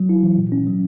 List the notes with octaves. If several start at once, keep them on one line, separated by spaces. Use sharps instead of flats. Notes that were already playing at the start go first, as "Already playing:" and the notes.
Already playing: F#3
E4
E3
A#2
C#4
F#3